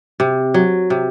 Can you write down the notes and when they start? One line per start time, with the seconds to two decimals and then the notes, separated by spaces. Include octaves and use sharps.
0.20 C3
0.54 F#3
0.90 C3